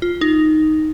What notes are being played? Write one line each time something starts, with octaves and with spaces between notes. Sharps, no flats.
F4
D#4